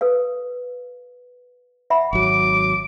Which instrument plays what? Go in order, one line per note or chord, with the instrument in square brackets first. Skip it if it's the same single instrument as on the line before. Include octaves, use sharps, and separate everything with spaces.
[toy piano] A4 B4 F5
E5 F#5 B5
[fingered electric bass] G#1 F#3 [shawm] D6